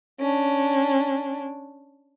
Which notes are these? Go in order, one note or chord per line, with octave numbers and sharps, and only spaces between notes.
C#4 D4